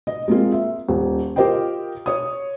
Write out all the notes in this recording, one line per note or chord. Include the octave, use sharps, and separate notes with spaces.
D#5
G#3 A#3 C4 F4
E5
D#1
F4 G4 A#4 C5 D#5 G5
C#5 D#6